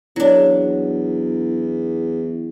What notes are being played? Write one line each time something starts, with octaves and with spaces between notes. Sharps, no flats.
E2 F#3 D4